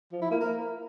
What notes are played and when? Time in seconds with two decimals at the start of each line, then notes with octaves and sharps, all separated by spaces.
0.12 F3
0.22 E4
0.31 A#3
0.41 A#4